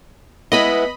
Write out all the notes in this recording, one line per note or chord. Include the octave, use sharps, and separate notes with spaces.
G#3 B3 E4 D#5 B5